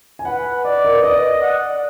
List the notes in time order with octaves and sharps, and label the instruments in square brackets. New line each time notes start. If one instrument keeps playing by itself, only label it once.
[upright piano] G#5
[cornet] B4 [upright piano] F#5
[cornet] D5 [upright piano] D#5
[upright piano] A#4
B4
[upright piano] D5 [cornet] D#5
[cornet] F#5